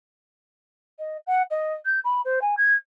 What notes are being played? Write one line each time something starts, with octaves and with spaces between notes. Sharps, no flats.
D#5
F#5
D#5
G6
B5
C5
G#5
G#6